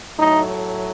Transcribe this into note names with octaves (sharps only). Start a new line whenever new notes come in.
A2 F#3 A3 D#4